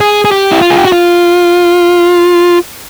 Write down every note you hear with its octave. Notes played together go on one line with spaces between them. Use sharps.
G#4
G#4
G4
E4
F4
G#4
G4
F#4
F4